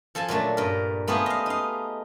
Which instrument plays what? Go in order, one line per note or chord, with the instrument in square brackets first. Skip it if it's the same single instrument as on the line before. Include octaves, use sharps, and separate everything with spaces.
[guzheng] F3 A4 G#5 A5
A#2 F#3 A3 D4
G2 A#4
A3 B3 F4 G4 G#4
D#5 F5
D#4 F5